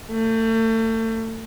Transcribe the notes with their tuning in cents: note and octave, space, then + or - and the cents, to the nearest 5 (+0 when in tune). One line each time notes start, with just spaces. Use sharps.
A3 +35